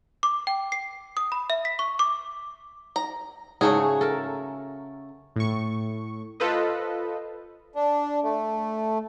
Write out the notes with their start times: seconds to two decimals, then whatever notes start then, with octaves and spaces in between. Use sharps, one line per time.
0.23 D6
0.47 G5
0.72 C7
1.17 D#6
1.32 B5
1.50 E5
1.65 B6
1.79 C#6
1.99 D6
2.96 A#5
3.61 G#2 C#3 F#3 A3 F#4 G#4
4.01 A4 A#4
5.36 A2 C#6
6.40 F4 A4 B4 C5 D#5
7.76 D4
8.23 A3